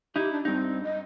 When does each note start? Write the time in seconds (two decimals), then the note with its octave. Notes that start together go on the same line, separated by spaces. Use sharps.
0.16 D#4 E4 G4
0.32 D4
0.45 G2 C4 D#4
0.83 D#5